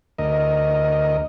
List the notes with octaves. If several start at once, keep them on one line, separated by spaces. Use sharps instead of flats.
D2 A#4 D#5